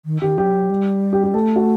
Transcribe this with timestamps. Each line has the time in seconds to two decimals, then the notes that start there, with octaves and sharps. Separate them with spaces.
0.05 D#3
0.22 D#3 G4
0.37 F#3 G4
0.70 G3
1.13 G4
1.24 G4
1.34 A3 A4
1.56 F#4